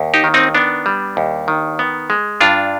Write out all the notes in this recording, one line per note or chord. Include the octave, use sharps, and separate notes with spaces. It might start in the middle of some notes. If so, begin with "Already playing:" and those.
Already playing: D#2
D#4 G4
D#3
C4 D#4
B3 D4
G3
D#2
D#3
B3
G#3
G2 D4 F4